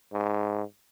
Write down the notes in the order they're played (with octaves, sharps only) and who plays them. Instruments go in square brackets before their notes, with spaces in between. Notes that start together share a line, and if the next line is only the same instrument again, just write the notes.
[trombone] G#2